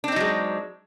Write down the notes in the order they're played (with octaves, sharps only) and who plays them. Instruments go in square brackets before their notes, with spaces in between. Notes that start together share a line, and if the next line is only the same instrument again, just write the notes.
[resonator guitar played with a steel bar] D4
C4
D#4
F#3
G#3